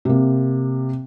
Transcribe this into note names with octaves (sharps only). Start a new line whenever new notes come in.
C3 A#3